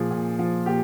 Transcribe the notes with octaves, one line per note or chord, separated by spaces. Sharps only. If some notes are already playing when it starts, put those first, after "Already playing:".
Already playing: A#2 F3 G#4
A#2
F3
A#2 G4